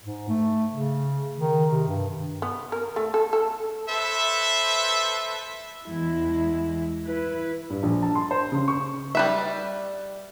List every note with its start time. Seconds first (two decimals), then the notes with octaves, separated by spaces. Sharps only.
0.04 G#2
0.29 A3
0.71 C#3
1.39 D#3
1.71 C3
1.87 G2
2.42 B3
2.72 A#4
2.96 A3
3.14 A4
3.33 A4
3.89 A4 B4 C5 E5
5.86 E2 G#3 E4
7.04 E4 B4
7.70 G2
7.83 A#1
8.02 A5
8.15 C6
8.31 C5
8.52 C#3
8.68 C#6
9.15 G3 B4 E5